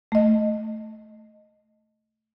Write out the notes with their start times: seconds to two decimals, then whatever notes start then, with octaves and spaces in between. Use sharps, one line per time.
0.12 A3 D#5